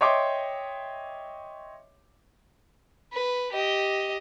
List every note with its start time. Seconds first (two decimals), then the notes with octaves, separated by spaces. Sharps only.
0.01 C#5 D#5 E5 G5 C6 D6
3.13 B4
3.52 G4 D#5